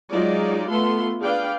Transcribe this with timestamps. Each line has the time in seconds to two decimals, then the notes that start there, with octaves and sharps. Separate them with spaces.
0.11 F#3 G#3 D#4 F4 D5
0.70 A3 B3 F4 A4 C6
1.21 D4 G#4 B4 D5 F5 G5